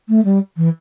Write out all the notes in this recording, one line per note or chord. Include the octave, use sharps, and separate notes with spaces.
A3
G3
E3